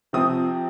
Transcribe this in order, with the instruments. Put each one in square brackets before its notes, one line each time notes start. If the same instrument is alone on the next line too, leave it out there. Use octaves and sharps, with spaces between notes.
[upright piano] C3 F3 C4 D#6